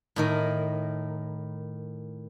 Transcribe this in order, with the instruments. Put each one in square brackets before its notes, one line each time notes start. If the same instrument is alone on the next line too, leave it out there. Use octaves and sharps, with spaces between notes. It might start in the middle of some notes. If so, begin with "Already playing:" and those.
[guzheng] A2 D#3 A#4